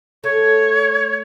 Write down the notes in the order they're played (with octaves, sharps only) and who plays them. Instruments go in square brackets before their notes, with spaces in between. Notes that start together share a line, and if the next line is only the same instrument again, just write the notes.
[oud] A3 [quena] C#5